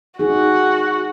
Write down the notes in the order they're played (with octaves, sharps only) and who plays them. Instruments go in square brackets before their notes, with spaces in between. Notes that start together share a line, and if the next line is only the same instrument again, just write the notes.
[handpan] D#4 G#4 [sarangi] F#4